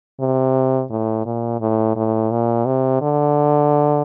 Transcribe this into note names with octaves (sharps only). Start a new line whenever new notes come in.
C3
A2
A#2
A2
A2
A#2
C3
D3